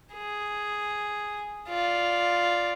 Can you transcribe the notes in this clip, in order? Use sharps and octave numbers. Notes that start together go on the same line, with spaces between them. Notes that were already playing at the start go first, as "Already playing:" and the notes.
G#4
F4 D5